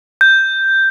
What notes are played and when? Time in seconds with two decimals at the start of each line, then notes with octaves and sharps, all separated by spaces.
0.21 G6